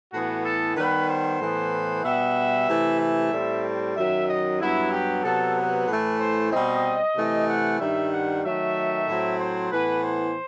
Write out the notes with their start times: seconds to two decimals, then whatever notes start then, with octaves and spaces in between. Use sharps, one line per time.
0.12 A2 E3 B3 F#4
0.45 A4
0.76 D#3 G3 B3 B4
1.09 C5
1.41 A2 E3 B3
2.04 B2 G3 B3 E5
2.68 C3 E3 A3
3.00 E5
3.32 A2 G3 C4
3.96 F#2 D#3 F#3 E5
4.28 D#5
4.60 G2 F#3 B3 E4
4.92 G4
5.23 C3 F#3 B3 A4
5.56 B4
5.88 A2 E3 A3
6.20 C5
6.52 B2 G3 C4 D#5
7.16 C3 E3 A3
7.48 F#5
7.79 G2 D#3 G3 E5
8.12 F#5
8.44 D#3 F#3 A3 E5
9.07 A2 F#3 C4
9.39 C5
9.71 A2 E3 B3 B4
10.03 C5